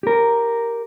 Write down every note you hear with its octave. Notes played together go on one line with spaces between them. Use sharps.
G4 A#4